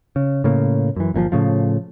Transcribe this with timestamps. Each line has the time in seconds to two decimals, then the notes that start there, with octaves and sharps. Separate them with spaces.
0.16 C#3
0.44 A2 C#3 A#3
0.96 F#2 E3
1.14 G1 A#2 C#3 F3
1.32 A2 C#3 F3